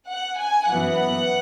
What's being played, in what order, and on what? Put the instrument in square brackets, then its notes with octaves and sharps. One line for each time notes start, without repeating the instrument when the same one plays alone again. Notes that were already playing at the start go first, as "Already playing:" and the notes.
[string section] F#5
G#5
F#2 E3 B3 F#5